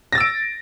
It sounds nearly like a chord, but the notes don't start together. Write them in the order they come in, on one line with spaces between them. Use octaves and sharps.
A#6 A6 E6 D7